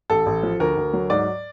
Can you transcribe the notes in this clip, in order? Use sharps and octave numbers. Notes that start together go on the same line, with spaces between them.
A1 A4
A1
F3
D2 A#4
D2
F#3
G#2 D5